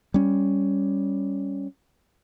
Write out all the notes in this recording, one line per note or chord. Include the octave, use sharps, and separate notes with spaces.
G3 C#4